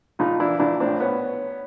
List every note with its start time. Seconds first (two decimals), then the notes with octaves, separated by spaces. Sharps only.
0.19 A#1 D#4 F4
0.39 E3 D4 E4
0.60 A#1 D4 E4
0.80 A2 C4 D4
1.00 B3 C#4